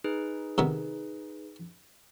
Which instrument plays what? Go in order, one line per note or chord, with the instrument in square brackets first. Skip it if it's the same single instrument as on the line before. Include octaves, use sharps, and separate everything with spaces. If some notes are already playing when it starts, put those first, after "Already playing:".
[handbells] D#4 G#4 B4
[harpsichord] C3 D#3 B3